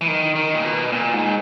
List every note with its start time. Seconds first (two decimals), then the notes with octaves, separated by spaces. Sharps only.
0.01 E3
0.08 D#3
0.36 D#3
0.54 A#2
0.64 B2
0.92 A#2
1.14 G#2